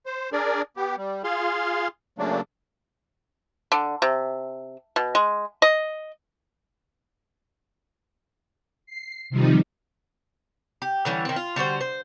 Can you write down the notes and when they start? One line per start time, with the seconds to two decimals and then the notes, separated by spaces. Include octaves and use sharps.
0.06 C5
0.33 D4 G#4 A#4 D5
0.77 B3 G4
0.98 G3
1.24 F4 G#4 F5 C6
2.19 C#3 F#3 A3 A#3 D4
3.72 D3
4.02 C3
4.96 B2
5.15 G#3
5.62 D#5
8.86 C7
9.30 C3 D#3 F3 G3 D#4
10.82 G4
11.05 D3 E3 G3 C#4
11.25 D#3 C4
11.36 F4
11.56 D3 G3 F#4 C5
11.81 C5